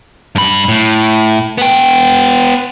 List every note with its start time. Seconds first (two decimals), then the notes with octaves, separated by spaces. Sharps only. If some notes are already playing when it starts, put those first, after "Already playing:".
0.35 G2 B5
0.68 A2
1.58 B3 G5